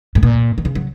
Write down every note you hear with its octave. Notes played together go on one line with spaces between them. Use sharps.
G#2
A#2
D#3
C#3
F#3